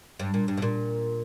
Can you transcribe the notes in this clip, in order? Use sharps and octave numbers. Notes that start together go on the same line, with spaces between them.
G2
A#2
G2
B2
A#2